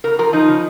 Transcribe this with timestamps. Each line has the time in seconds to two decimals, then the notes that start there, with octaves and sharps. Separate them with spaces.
0.04 C#3 A#4
0.19 F3 A#4
0.33 F3 D#4
0.48 C#3